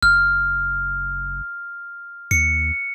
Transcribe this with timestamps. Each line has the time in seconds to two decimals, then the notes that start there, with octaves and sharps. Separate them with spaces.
0.03 F#1 F6
2.31 D#2 C#7